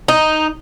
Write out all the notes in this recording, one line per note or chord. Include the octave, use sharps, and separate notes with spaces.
D#4